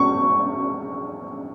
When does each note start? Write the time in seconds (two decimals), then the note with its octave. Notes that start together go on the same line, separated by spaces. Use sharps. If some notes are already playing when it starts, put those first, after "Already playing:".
Already playing: C#6